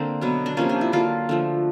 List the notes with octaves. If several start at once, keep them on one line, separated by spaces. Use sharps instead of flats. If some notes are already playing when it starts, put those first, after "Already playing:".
Already playing: D3 A#3 C4
B2 F#3 B3
D4
C3 F3 A#3 C#4
D4
E4
D3 F#3 A#3 F4
D3 F3 A3